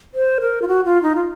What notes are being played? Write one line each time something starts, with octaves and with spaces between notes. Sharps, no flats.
C5
A#4
F4
F#4
F4
D#4
F4